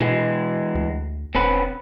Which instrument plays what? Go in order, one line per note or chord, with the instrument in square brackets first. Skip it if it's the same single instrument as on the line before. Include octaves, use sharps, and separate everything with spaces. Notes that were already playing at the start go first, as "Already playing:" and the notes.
[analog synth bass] B2 [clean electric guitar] E3 G#3
[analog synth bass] D2
[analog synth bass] E1 [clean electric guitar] C4 C#4 B4